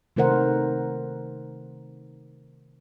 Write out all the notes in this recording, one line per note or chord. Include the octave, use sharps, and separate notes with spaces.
C3 D#3 A3 A#4 C5 F#5